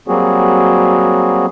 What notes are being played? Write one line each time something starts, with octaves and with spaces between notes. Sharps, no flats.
F#3 G3 A#3 C4 F#4 G#4